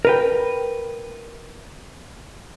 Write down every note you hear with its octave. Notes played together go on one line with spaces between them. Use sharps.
A#4 B4 G5